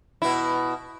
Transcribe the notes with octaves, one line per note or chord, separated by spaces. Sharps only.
B2 E4